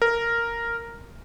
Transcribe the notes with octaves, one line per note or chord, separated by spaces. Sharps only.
A#4